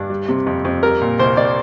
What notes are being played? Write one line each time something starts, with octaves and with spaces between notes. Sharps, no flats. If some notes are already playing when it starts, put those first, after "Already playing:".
Already playing: G2 D4
G3
C3
F2
F2
G3 A#4
A#2
C2 C5
C2 D5